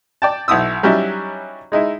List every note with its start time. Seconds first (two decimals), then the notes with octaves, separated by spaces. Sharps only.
0.22 D5 G5 A5
0.48 B1 E4 D#6 E6
0.83 F#3 G3 C#4 D#4 E4
1.72 G#3 D#4 E4